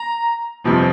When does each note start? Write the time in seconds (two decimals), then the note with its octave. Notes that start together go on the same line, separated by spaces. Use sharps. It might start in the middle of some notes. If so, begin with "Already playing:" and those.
Already playing: A#5
0.64 G1 F2 C3 F3